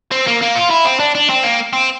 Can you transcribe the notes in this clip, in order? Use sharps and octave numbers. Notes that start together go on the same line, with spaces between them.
C4
A#3
A#3
F4
E4
C4
D4
D4
C4
A#3
C4